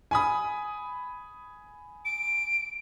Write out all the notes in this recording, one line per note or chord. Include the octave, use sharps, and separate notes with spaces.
G#5 B5 D#6
D7